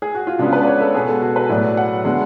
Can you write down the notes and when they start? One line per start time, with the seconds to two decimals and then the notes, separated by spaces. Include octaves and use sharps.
0.02 G#4
0.15 F#4
0.27 F4
0.39 C#3 G#3 B3 D4
0.53 B4
0.63 D5
0.67 C#5
0.81 A4
0.94 B2 G#3 B3 G#4
1.09 A4
1.22 F#4
1.36 B4
1.49 A2 F#3 B3 D5
1.77 F#5
2.05 D3 G#3 B3